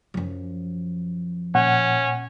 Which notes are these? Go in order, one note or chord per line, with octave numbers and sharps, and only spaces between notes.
F#2 F3
A#2 C#4 F#5